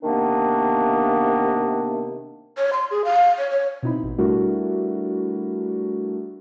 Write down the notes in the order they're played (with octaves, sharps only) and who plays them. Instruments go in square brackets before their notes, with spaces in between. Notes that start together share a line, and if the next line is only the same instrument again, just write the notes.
[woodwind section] C3 D#3 A#3 B3 D4
[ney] C#5
C6
G#4
F5
C#5
C#5
[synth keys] B2 C4 D#4 E4 B5
A1 B2
G3 A3 D4 E4 F#4 A#4